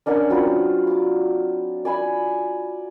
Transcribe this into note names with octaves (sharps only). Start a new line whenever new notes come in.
C#4 D4 A#4 F#5
F#3 C4 F4 B4
D6
D5 G#5 B5